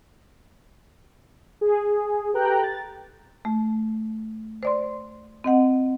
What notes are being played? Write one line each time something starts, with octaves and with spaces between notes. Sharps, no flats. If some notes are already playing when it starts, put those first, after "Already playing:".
G#4
G4 A4 B4 G5 A#5 F#6
A6
A3
C5 D5 C6
C4 D#5 F#5